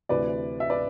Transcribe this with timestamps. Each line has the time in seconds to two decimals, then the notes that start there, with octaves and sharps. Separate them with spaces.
0.09 D2 C3 E3 B4 D5
0.60 E5
0.70 B4 D5